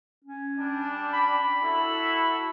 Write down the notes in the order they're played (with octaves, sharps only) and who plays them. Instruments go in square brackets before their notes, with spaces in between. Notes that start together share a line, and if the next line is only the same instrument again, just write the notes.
[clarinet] C#4
[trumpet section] G3 D4
[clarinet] B5
[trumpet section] E4 F#4 A4